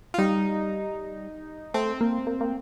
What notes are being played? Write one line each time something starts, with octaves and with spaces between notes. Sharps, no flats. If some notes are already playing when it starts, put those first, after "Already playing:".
F4
G3 D#4
A3 C4
A#3
A#3
A#3